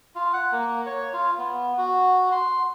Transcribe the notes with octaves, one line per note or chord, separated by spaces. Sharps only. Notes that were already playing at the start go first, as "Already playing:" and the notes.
F4
F#5
A#3
C#5
F4
B3
F#4
C6